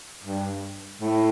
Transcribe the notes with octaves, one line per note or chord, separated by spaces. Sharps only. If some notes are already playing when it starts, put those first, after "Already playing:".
G2
A2